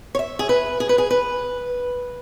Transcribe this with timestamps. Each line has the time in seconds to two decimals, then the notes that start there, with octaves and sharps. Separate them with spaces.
0.15 C#5
0.19 E5
0.39 G#4
0.49 B4
0.80 G#4
0.89 B4
0.98 G#4
1.11 B4